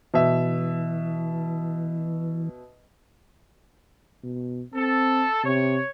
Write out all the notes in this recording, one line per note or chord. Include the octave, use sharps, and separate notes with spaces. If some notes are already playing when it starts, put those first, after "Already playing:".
B2 E3 E5
B2
C4 A4
C3 C#5